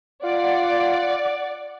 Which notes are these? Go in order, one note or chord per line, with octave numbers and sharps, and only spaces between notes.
F4 D5 F#5